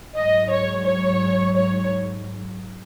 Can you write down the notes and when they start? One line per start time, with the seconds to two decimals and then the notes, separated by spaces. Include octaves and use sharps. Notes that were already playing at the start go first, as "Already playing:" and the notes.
0.16 G#2 F#3 D#5
0.51 C#5
0.85 C#5
1.56 C#5